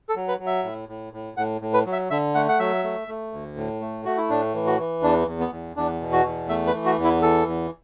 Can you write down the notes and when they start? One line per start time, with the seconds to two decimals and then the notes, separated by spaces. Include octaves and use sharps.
0.09 A4
0.15 F#3
0.28 B4
0.40 F#3
0.46 E5
0.64 A2
0.89 A2
1.13 A2
1.37 A2 F#5
1.61 A2
1.74 B4
1.86 F#3
1.92 E5
2.11 D3 E5
2.35 A3 F#5
2.49 F#5
2.59 F#3 E5
2.84 A3
3.08 A3
3.32 D2
3.57 A2
3.81 A3
4.05 A3 F#4
4.17 E4
4.30 A2 D4
4.54 E3
4.66 F#4
4.79 E3
5.03 E2 D4
5.28 E2
5.40 B3
5.52 E2
5.76 E2 D4
6.01 B2
6.13 F#4
6.25 E2
6.49 A3 E5
6.67 B4
6.74 E3
6.86 F#4
6.98 E2
7.04 E4
7.22 E3 A4
7.47 E2